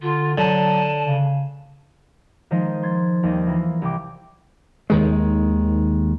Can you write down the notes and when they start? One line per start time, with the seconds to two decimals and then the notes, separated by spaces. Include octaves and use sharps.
0.02 D3 F4
0.38 D3 F#3 A5
1.07 C#3
2.51 D#3 F3 G#3 D#4 C5 D#5
2.83 C6 G#6 A6
3.23 D#2 G3 D#5 A#6
3.47 E3 A#3 F4
3.82 C2 G5 D6
4.90 D#2 D#3 G#3